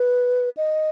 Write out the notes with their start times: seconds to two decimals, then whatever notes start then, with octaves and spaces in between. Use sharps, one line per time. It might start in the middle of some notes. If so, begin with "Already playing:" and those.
Already playing: B4
0.57 D#5